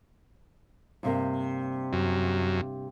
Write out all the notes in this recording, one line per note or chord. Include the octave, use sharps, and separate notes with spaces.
G2 C3 A#3
F#2